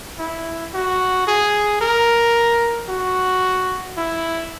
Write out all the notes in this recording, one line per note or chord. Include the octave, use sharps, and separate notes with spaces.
E4
F#4
G#4
A#4
F#4
E4